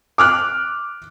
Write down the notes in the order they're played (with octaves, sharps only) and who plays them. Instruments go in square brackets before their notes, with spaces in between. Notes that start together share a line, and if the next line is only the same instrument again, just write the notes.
[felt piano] D6 F6 F#6